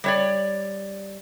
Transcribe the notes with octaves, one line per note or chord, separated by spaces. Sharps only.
G3 C#5 D5